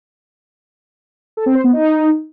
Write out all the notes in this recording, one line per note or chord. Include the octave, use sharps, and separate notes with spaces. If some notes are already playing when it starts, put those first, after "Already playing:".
A4
C4
C5
B3
D#4